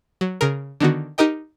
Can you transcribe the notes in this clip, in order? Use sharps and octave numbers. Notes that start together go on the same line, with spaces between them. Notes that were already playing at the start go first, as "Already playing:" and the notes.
F#3
C#3 G#4 A#4
D3 D#3 B3 F#4
D#4 G4 A#4 D#5 G5